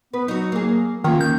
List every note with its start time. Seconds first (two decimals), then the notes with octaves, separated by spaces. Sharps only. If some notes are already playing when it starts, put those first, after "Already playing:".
0.13 B3 B4
0.28 F#3 D#4 F#4
0.52 A#3 G#4
1.04 D#3 A#3 C#4 F4
1.21 D#3 G6